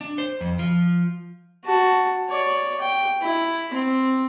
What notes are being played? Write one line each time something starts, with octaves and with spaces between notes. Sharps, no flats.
D4
C5
F2
F3
F#4 A5
C#5 D5
G5
E4
C4